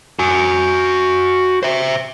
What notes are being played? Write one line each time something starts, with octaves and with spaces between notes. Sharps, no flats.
F#4 G#5
C5 E5